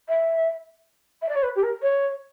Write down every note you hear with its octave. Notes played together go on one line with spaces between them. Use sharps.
E5
E5
D5
C#5
B4
G4
A#4
C#5